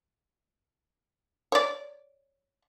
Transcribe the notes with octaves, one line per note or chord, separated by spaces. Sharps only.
C#5 D5